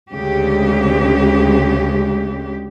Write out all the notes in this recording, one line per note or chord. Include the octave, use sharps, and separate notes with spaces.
D2 C#3 G#3 G4